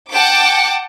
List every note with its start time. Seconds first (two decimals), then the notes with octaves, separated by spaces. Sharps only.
0.11 F#5 G5 A5 D6